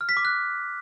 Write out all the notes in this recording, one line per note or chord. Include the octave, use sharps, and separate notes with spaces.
F6
B6
D6
F#6